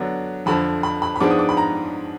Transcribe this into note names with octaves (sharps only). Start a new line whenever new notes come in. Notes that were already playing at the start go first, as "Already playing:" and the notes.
Already playing: D3 F#3 B3 D4
F2 D3 F3 B5
B5
B5
B5
G#2 F3 G#3 B3 D4 D6
D#6
D6
B5
A#5